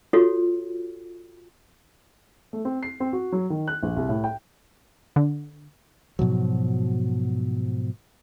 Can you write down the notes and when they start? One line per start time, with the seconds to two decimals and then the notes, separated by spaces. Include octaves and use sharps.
0.13 F4 F#4 A4 C#5
2.53 A3
2.65 C4
2.83 C7
3.00 C4
3.13 F#4
3.32 F#3
3.50 D#3
3.68 F#6
3.83 A#1
3.96 C2
4.09 A2
4.24 G5
5.16 D3
6.19 G#2 B2 F3 F#3